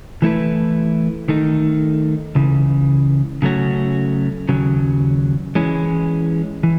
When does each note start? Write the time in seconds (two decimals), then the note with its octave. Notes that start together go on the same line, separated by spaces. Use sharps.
0.22 E3 A3 E4 B4
1.29 D#3 A3 D#4
2.35 C#2 C#3 E3
3.42 C#3 F#3 A3 C#4 F#4
4.49 D#2 C#3 F#3
5.55 E3 G#3 C#4
6.63 E3